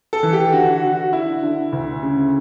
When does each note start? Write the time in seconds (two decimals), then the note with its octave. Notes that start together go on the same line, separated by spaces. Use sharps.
0.13 A4
0.23 E3
0.33 G4
0.52 D3 F#4
0.73 F#4
0.83 D3
0.93 F#4
1.13 D3 E4
1.43 D3
1.73 D2
2.03 C#3